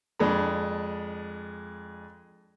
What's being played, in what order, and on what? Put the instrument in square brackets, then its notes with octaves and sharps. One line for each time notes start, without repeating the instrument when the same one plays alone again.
[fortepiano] F2 G#3 D4 B5